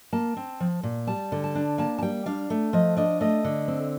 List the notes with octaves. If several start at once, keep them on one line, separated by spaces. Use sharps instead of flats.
A#3 A5
C4
F3
A#2
G3 A5
D3
A5
D4
A#3 A5
A5
G3 G5
D4 F5
A3
F3 D#5
D4 D#5
A3 D#5
D3
C4